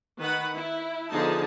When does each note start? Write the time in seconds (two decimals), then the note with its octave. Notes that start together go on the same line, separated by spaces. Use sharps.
0.19 D#3 B4 F#5 B5
0.55 E4
1.10 D3 F3 B3 D#4 G#4 A5